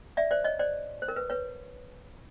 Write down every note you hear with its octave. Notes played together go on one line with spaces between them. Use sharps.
D5 E5
C5 D5
C#5 D#5
C5 D5
C5
A#4
B4
B4 C#5